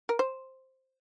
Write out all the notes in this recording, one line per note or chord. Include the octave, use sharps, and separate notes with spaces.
A#4
C5